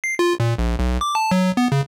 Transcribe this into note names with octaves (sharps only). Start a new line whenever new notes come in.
C7
F4
A#2
A#1
B1
D6
A5
F#3
B3
C#3